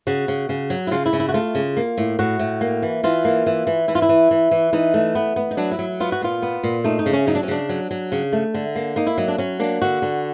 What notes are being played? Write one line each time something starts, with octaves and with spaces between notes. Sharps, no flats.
C#3 F#4
C#3
C#3
F#3
E4
C#3 F4
E4
C#3
E4
F#4
A3 F4
C#3
A#3
A2
A2 F#4
A2
A#3
E3
E3 F4
A#3
E3
E3
E3 E4
F4
E4
E3
E3
E3
E3 D#4
A3
B3
B3
D#4
F#3 D4
E4
F#3
B3 F4
F#4
A#2 F4
B3
A#2
A3 D#4
D#4
C#3
C#4
F#3 D#4
D4
C#4
C#3 D4
F#3
F#3
C#3
A3
D3
A#3
A#3 D#4
E4
F#3 D#4
D4
F#3 C#4
A#3 D4
D3 F#4
D3